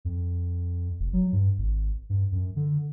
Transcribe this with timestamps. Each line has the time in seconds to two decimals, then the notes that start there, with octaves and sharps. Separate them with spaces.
0.05 F2
1.00 F1
1.13 F#3
1.33 G2
1.58 G#1
2.09 G2
2.32 F#2
2.56 D3